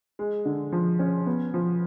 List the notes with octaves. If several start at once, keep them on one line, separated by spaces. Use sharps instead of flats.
G#3
D3
F3
C#4
B3
F3